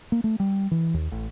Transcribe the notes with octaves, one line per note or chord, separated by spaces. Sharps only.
A#3
A3
G3
E3
D#2
A1